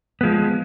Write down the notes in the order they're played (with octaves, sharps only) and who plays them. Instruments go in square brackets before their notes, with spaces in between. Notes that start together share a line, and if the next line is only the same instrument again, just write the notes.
[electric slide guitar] F3 G#3 B3